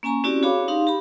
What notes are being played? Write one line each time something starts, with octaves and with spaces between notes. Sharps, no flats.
A#3 C#4 G#5 A#5 C#6
C4 C#4 E4 F#4 G4 D5
F#4 G#4 C#5 F5 B5 D6
D#4 G4 F5 C6
G4 B5